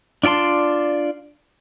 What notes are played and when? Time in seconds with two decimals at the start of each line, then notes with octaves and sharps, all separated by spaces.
0.23 D4 F4 D5 A5 C6